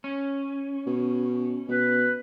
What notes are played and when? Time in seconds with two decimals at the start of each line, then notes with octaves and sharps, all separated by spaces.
0.04 C#4
0.86 B2
1.69 B2 B4